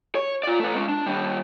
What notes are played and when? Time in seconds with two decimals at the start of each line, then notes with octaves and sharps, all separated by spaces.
0.15 C#5
0.44 F4 D5
0.60 A3 B4
0.75 G#3 C#4
0.89 D4
1.06 D#3 G3